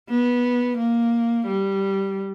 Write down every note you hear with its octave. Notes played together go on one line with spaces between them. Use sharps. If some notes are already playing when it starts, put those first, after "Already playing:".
B3
A#3
G3